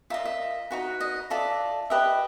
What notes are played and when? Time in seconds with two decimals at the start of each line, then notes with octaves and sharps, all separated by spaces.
0.10 F4 A#4 D#5 E5
0.25 E5
0.71 D#4 F#4 B4
1.01 D#5
1.30 F4 A4 D5 E5
1.90 G4 B4 D#5 E5